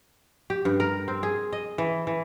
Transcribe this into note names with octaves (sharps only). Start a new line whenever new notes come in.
G4
G2
A#4
C4
G#4
D#5
E3
E3